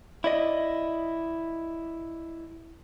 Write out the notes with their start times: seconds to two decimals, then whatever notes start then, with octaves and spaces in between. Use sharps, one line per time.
0.24 E4 D5 D#5